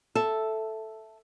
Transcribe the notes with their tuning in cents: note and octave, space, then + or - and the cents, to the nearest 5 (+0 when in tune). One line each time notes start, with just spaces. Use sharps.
A4 +0 E5 +0